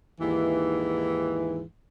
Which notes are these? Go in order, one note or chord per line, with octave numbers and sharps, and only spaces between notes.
D#2 G#2 E3